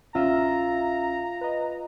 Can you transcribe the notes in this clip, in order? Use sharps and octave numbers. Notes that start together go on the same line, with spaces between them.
A#1 C#4 F4 E5 A#5 E6
B4 D#5